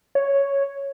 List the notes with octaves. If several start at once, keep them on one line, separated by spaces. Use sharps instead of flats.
C#5